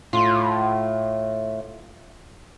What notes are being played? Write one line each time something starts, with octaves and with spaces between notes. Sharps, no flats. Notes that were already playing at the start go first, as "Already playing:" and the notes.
A2 F4